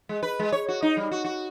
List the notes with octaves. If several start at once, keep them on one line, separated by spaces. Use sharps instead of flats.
G#3
B4
G#3
C#5
F#4
D#4
G3
F#4
F#4